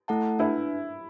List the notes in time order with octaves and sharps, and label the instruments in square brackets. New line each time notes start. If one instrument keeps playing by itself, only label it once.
[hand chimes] A3 E4 A4 F#5 A5
[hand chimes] D4 B4 E5 [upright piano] E4